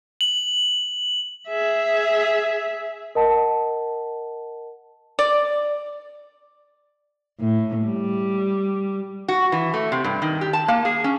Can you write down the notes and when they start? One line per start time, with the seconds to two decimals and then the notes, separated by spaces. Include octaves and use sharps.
0.21 F#7
1.48 G#4 E5
3.15 A#4 D#5 F#5 A5
5.19 D5
7.40 A2
7.86 G3
9.28 F#4
9.52 E3
9.74 A3
9.92 C3
10.04 G2
10.22 D#3
10.41 G4
10.53 A5
10.68 A#3
10.85 G#4
11.04 C#4